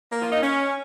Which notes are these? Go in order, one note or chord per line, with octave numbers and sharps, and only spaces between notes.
A#3
F4
D#4
C#4